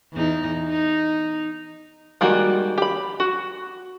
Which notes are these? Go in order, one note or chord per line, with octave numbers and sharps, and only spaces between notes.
E2 D#4
D#4
D#3 G3 G#3 A#3 F#4
G4 B5
F#4